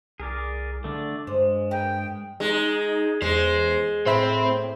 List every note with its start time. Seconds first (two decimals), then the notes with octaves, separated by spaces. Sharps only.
0.20 C2 G#4 A#4 D5
0.84 D3 A3 D4 D5
1.27 G2 G#3 C5
1.71 A#4 B4 D#5 G5
2.40 G#3 D#4
3.22 E2 G#3 C5
4.06 A2 C4 C5 E5 B5